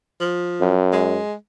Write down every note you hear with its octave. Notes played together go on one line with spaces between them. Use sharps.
F3
F#2
G#3